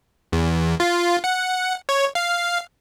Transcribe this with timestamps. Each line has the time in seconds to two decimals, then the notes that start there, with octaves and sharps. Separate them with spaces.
0.32 E2
0.80 F4
1.24 F#5
1.89 C#5
2.15 F5